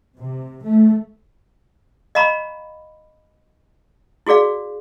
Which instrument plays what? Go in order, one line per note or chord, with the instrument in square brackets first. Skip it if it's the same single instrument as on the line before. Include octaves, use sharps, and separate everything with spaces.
[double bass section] C3
A3
[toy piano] D#5 F5 A#5 B5 C#6
E4 F#4 G#4 D5 F5